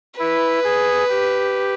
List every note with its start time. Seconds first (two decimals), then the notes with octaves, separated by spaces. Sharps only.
0.19 E4 B4
0.64 G#4
1.09 G4